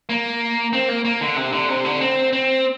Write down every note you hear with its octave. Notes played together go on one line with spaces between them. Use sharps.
A#3
C4
A#3
A#3
D3
C3
D3
C3
D3
C4
C4